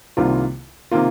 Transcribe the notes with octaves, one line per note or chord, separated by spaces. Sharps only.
C2 C3 D#3 A#3 F4
C3 D#3 A#3 F4